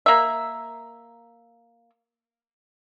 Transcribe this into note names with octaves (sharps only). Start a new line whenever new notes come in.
A#3 E5